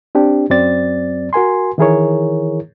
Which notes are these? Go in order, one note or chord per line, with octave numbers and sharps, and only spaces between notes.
C4 D4 G4
F#2 F#3 C4 D5 A6
F#4 A#4 G#5 C6
D#3 E3 E4 G#4 A#4 C#5